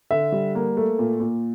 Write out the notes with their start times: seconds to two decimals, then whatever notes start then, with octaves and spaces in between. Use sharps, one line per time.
0.10 D3 E5
0.32 G3
0.55 A#3
0.77 A3
0.99 A#2
1.20 A#2